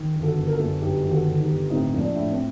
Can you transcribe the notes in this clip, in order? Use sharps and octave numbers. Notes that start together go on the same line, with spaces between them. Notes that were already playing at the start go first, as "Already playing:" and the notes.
Already playing: D#3
G1
F#4 A4
G1
A#4
F#4 A4
F#2
G1 D#4 G4
D#3
F#4 A4
G1
D#4 G4
G1
A2 C4 D#4
A#1
D4
A2
C4